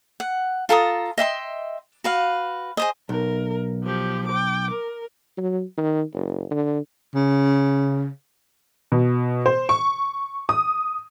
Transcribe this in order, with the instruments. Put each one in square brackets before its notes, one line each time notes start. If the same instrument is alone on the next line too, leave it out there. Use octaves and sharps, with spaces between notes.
[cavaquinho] F#5
F4 A4 A#5 D#6
D#5 E5 G5 C6
F#4 B4 F5
G#4 C5 D#5
[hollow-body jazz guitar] B1 [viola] A#4
[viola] F3 G4
G5 D6
A#4
[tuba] F#3
D#3
F#1
D3
[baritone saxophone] C#3
[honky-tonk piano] B2
C5
C#6
D#6